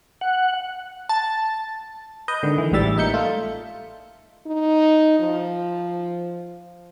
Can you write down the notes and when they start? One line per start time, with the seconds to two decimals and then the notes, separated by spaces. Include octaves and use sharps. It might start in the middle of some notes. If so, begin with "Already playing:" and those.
0.21 F#5
1.09 A5
2.28 B4 D#5 G6
2.43 G#2 D3 D#3
2.58 E3
2.72 A1 G#2 G3 E5 A6
2.97 A#2 D#4 E5 G6 C#7
3.14 A3 F4
4.47 D#4
5.20 F3